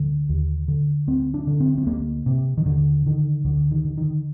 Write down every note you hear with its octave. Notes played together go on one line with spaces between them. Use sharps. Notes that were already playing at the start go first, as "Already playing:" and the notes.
Already playing: D2 D3
D#2
D3
D2 C4
D4
D3
C4
C4
D2 A#3
C3
D#3
D#2 D3
D3 D#3
D2 D3
D#3
D3
D#3